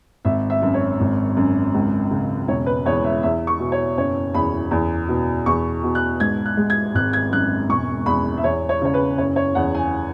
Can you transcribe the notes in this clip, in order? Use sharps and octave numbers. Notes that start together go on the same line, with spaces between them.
G#1 E5
E5
F#2
C#5
G#1
F#2
C#2
C#3
E1 C#5
B4
E2 C#5
E5
E2 E5
C#6
B2
C#5
F#1 C#5
E2 B5
E2
B2
E2 C#6
B2
F#6
G#2 G#6
F#6
G#3
G#6
G#1 F#6
G#6
F#2 F#6
E1 C#6
E2 B5
E5
E2 C#5
C#5
C#3 C#5
B4
F#1 C#5
C#5
E2 F#5
G#5